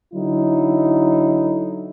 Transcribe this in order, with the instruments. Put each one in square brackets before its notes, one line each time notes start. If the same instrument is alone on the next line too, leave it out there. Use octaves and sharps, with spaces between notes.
[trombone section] D3 F#3 D#4 E4